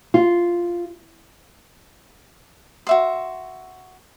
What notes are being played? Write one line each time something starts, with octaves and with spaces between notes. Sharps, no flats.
F4
F#4 E5 C6